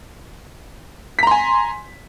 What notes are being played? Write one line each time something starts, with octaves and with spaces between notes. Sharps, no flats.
G#5 A#5 C6 B6